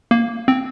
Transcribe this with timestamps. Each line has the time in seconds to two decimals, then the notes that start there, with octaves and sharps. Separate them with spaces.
0.11 A#3
0.48 C4